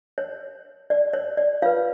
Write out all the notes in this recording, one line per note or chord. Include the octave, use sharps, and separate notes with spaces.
C#5
D5
C#5
D5
F4 B4 C#5 F5